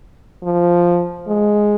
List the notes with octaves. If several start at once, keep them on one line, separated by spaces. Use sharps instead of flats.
F3
G#3